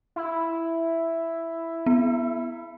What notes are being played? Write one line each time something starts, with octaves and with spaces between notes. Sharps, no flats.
E4
B3